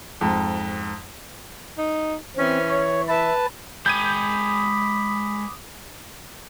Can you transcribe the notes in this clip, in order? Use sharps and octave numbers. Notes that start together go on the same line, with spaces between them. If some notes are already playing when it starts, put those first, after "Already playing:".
F2 G#2
D#4
E3 C4 C#4
C#5
B4 E5 A5
G#3 G5 B5 D6 D#6 G6 G#6 D#7